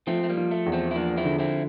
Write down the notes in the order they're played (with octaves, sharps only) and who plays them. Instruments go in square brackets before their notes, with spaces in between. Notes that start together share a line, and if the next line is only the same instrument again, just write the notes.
[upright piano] F3 [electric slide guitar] A3 C4
[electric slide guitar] A3
G3 A#3
[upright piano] F3
[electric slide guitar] A3
[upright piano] E2
[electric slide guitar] A3 C4
E4
[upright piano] F3 [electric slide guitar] A#3 D4
[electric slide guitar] C4 E4
[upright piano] D3
[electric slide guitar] C4 E4